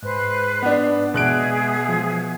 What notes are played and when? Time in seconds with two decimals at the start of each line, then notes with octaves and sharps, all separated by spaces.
0.02 G#2 B4 C5 F#6
0.62 B3 D4
1.14 B2 G#3 G#4 E5 F#6 D7
1.89 F3